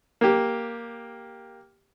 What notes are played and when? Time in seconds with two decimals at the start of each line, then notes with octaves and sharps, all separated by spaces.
0.21 A#3 G4